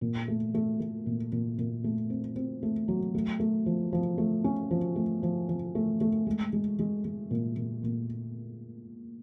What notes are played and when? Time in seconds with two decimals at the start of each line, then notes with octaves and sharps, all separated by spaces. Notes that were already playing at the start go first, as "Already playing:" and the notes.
0.01 A#2
0.28 A3
0.54 A3
0.80 A3
1.06 A#2
1.32 A#2
1.58 A#2
1.84 A3
2.10 C4
2.36 C4
2.63 A3
2.88 F#3
3.15 A3
3.40 A3
3.66 F3
3.93 F3
4.18 A3
4.44 C#4
4.71 F3
4.96 A3
5.23 F3
5.49 F3
5.75 A3
6.01 A3
6.27 G#3
6.53 G#3
6.79 G#3
7.04 G#3
7.31 A#2
7.57 A#2
7.83 A#2